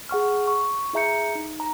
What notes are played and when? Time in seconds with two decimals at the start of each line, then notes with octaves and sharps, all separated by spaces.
0.09 G#4 F#5 C#6 F6
0.47 C#6
0.93 E4 G#4 E5 A#5 G6 C#7
1.35 D#4
1.60 A#5